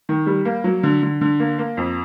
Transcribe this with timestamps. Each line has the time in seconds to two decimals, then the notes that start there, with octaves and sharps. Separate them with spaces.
0.09 D#3
0.26 G3
0.45 A#3
0.64 F#3
0.83 D3
1.03 D3
1.21 D3
1.40 A#3
1.59 A#3
1.77 F2